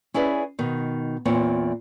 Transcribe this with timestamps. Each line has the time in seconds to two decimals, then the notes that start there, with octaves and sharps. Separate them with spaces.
0.14 C#4 E4 G#4 B4 D5
0.59 B2 D#3 D#4
1.25 E2 A#2 C4 C#5